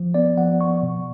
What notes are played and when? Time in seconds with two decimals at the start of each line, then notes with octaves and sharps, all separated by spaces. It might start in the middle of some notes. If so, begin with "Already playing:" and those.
Already playing: F3
0.14 B3 D5
0.37 F3 F#5
0.60 B3 C#6
0.82 B2